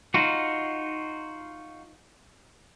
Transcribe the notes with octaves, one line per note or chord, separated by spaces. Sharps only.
D#4 F4 F#4